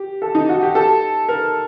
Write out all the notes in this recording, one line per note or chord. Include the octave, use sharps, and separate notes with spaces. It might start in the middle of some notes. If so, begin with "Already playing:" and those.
Already playing: G4
A4
D#4
F#4
G4
A4
A#4